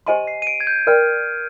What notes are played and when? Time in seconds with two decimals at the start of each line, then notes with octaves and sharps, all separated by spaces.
0.07 G4 C5 D#5 G#5 C6 D#7
0.27 C7
0.42 D#7
0.47 D7
0.60 G#6
0.67 G6
0.87 A#4 D5 G5 F6